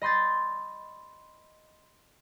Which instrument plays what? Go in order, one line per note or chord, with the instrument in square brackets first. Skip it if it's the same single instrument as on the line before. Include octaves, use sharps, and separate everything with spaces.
[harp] D#5 B5 C6 G6 A6